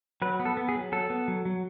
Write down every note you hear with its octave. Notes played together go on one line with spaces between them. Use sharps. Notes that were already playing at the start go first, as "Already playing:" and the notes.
F#3 B4
B3
A4
B3
G#4
F#3
F#3 A4
B3
F#3
F#3